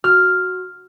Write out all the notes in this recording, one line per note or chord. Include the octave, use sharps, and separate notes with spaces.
F#4 F6